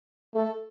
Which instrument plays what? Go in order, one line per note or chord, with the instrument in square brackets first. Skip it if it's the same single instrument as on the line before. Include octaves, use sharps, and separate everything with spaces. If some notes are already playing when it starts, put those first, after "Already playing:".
[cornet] A3 [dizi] A4